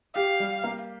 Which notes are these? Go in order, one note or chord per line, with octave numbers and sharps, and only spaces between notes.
G4 F5
G3
A#3